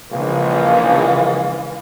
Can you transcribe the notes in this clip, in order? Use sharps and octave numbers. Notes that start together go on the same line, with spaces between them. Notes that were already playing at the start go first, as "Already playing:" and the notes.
A#1 C#3 E3 G#3 F5